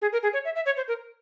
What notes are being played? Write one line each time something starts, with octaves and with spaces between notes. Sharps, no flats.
G#4
A#4
G#4
C#5
E5
E5
C#5
C5
A#4